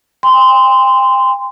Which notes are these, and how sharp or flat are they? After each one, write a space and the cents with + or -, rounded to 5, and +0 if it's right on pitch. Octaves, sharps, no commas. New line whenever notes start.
G5 +40 C6 -15